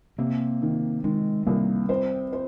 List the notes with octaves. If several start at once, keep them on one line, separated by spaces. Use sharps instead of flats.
C3 A#3
D#3
D#3 G#3
C2 A#3
C4 C5
C5